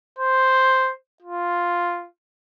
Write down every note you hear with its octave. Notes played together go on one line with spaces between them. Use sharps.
C5
F4